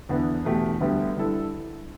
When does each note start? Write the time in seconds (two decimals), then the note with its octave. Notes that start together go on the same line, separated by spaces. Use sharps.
0.09 E2 D3 B3 E4
0.45 E2 B2 A3 G4
0.80 D2 D3 G3 B3 G4
1.16 D3 G3 E4 A4